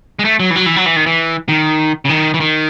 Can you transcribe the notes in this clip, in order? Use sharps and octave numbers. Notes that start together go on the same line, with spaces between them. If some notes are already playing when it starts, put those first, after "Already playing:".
G#3
A3
F#3
E3
F#3
E3
F#3
E3
D#3
E3
D#3
C#3
D#3
E3
D#3